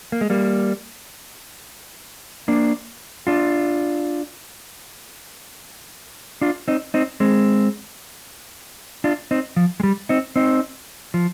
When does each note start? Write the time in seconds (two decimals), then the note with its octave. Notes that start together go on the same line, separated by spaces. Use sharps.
0.12 A#3
0.21 G#3
0.30 G3 A#3
2.48 A#3 D4
3.27 D4 F4
6.41 D4 F4
6.68 C4 D#4
6.94 C4 D#4
7.20 G#3 C4
9.04 D4 F4
9.31 C4 D#4
9.56 F3
9.80 G#3
9.83 G3
10.09 C4 D#4
10.36 C4 D#4
11.14 F3